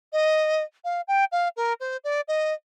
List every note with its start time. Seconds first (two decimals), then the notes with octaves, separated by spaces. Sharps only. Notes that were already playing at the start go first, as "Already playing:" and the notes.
0.13 D#5
0.85 F5
1.08 G5
1.32 F5
1.57 A#4
1.80 C5
2.04 D5
2.28 D#5